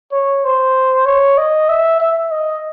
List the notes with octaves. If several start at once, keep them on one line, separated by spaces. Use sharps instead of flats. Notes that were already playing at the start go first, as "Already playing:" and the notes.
C#5
C5
C#5
D#5
E5
E5
D#5